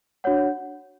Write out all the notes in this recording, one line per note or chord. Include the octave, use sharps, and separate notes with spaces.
D4 F#4 C#5 F#5